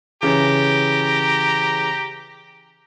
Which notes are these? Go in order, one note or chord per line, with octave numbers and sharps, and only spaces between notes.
C#3 E3 C#4 G4 A#5